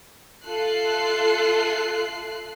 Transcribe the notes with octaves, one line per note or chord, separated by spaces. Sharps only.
F4 A4 E5 F#6 C7